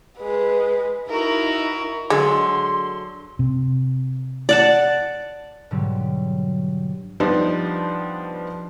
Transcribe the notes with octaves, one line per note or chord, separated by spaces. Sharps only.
G#3 B4
D#4 E4 F#4 A#4
D3 F#3 G#3 C6
C3
D5 F#5 A5
G#2 B2 D3 F#3 G3
F3 G3 B3 D4 D#4